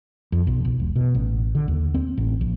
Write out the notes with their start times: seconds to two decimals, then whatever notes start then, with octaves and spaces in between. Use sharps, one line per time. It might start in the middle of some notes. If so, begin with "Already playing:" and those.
0.32 F2
0.47 B1
0.65 B1
0.80 E1
0.96 B2
1.15 A1
1.55 D3
1.68 D#2
1.94 C4
2.18 A1
2.41 A#1